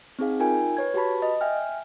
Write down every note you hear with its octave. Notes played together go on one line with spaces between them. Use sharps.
C4 D#4 G#4 F5
D#4 F4 A#4 G5 G#5
B4 C#5 G#6
F#4 G4 B4 A5 B5
D#5
E5 G5 G#5 F6